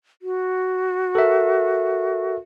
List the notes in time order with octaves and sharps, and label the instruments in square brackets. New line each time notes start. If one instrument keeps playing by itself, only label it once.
[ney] F#4
[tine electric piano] A4 A#4 E5